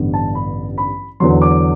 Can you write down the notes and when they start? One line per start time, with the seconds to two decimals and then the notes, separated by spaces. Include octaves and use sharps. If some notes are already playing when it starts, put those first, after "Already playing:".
Already playing: A1 G2 D3 G3 B3
0.14 A5
0.35 B5
0.78 B5
1.20 E2 D3 F#3 C6
1.42 D6